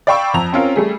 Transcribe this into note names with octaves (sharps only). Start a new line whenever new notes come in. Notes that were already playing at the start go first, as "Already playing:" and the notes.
D5 F5 G5 B5 C#6 E6
F2 A#5 F7
C4 C#4 F4 A#4
G3 A3 G#4